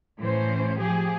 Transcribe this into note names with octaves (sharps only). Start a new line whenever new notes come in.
A2 E3 C#4 C5
F3 G4 G#4